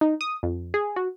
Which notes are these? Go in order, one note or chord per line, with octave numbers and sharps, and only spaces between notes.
D#4
D#6
F2
G#4
F#4